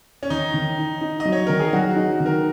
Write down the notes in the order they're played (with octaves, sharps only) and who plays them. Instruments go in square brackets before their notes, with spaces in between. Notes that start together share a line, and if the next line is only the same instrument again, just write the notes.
[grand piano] C#4
[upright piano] D#3 [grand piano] D#4
[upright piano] D#3
D#4
D#4
[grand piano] D#5
[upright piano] F#3
[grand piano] C#5
[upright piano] D#3 [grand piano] A#4
[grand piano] G#4
[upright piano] F#3 [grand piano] F#4
[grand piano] F#4
[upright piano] D#4
D#3
[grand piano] A#4